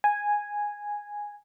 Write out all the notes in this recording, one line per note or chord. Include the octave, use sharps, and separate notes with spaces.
G#5